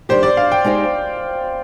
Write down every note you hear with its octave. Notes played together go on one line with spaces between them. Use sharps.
D#3 G3 D4 G4 C5
D5
F5
G5
G#3 D#4 G4 C5 F5